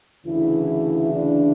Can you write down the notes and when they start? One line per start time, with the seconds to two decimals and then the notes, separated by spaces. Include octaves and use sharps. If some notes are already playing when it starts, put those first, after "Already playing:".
0.25 D2 C#3 E3 E4
1.12 D4